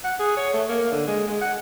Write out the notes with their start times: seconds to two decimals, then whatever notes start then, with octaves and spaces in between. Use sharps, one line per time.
0.04 F#5
0.19 G#4
0.37 C#5
0.54 A3
0.69 A#3
0.91 D3
1.07 G#3
1.29 G#3
1.42 F#5